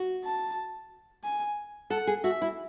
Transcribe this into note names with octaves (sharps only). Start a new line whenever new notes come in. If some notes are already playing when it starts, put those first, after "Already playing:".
Already playing: F#4
A5
G#5
A4 F#5
G#4
F#4 E5
E4